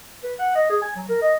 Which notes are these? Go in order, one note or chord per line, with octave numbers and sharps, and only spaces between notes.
B4
F#5
D#5
G#4
G#5
F#3
A#4
D#5